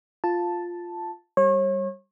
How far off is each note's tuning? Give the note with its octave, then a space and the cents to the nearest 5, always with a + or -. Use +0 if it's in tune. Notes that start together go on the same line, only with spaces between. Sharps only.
F4 +0 A5 +0
G3 +0 C#5 -35